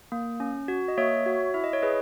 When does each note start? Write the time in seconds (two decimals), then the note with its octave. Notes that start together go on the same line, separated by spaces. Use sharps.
0.12 A#3
0.40 C#4
0.68 F#4
0.88 D#5
0.97 A#3 C#5 E5
1.26 F#4
1.54 E4 E5
1.64 D#5
1.73 C#5
1.82 G#4 B4 D#5